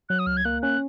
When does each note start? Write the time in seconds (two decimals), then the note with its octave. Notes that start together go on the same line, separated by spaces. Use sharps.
0.09 F#3 F#6
0.19 D#6
0.26 C#2 F6
0.37 G#6
0.45 A#3 F#6
0.62 C#4 F#6